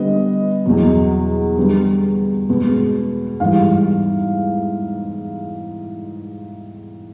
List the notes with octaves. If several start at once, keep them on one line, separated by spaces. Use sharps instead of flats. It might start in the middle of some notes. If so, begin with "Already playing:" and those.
Already playing: D3 G3 B3 D#5
E2 B2 F#3
D3 G3 B3
B2 G#3 B3
G#2 E3 G3 F5